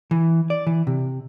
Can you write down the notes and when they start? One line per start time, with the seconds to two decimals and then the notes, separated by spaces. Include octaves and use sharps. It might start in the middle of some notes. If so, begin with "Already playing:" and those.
0.11 E3
0.50 D5
0.67 E3
0.87 C3